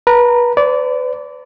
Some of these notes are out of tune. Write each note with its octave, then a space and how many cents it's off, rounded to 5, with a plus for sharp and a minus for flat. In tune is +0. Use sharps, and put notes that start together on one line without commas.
B4 -30 A#5 -25
B4 +40 D5 -25